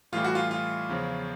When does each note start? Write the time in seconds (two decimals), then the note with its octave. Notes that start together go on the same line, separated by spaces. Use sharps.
0.12 A2 E3 G3 F4
0.24 F#4
0.35 F4
0.51 F4
0.89 E2 C#3 F3